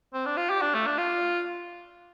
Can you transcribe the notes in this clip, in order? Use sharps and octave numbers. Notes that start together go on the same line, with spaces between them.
C4
D4
F4
G4
D4
A3
D4
F4